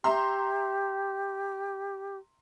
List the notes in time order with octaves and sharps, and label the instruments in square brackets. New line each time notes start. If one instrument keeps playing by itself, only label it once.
[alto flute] G4 [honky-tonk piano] E5 A#5 C6